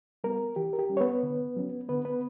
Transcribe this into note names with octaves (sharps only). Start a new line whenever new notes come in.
G3 B3 A#4
E3 G4
A#4
G4
G3 C#4
C#5
B3 B4
D3
F#3 C#4
D3 B3 B4
B3 B4